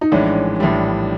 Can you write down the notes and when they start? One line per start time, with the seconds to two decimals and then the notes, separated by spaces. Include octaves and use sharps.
0.01 D#4
0.12 A#1 A2 E3 G#3 C#4 D4
0.60 A#1 A2 E3 G3